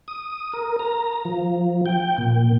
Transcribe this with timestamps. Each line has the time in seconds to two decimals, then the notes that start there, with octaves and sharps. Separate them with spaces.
0.08 D#6
0.53 A#4
0.79 A#5
1.25 F3
1.86 G5
2.18 A#2